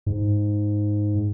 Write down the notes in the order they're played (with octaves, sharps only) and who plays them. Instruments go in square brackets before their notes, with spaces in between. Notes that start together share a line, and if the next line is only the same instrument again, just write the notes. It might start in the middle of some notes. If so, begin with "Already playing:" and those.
[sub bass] G#2